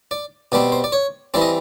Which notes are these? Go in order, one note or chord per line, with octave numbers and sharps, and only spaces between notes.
D5
B2 G3 C4 D5
C5
D5
C#5
E3 G3 C4 D5
D#5